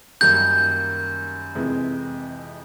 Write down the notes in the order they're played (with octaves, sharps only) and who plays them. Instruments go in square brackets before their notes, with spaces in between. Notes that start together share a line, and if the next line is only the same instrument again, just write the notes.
[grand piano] F#2 D#3 G3 A#3 [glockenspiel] G6
[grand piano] F2 C3 E3 G#3